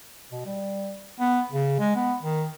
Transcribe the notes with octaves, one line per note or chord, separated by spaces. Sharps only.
B2
G3
B3
C#3
G#3
B3
D#3